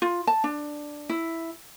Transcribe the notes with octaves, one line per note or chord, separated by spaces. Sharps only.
F4
A5
D4
E4